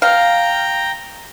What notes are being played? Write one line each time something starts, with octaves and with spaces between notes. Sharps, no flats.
F5 G5 A#5